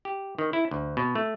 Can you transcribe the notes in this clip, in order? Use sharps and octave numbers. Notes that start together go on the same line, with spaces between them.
G4
D#3
E4
D2
B2
A3